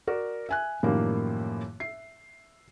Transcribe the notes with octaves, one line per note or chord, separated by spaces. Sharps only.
F#4 A#4 D5 F#5
E5 G#5 F#6
F#2 A2 D#3 F3 G3 A#3
E5 C7